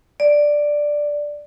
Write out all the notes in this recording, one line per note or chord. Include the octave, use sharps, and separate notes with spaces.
D5